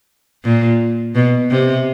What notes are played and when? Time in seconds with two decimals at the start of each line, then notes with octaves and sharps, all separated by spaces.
0.44 A#2
1.15 B2
1.51 C3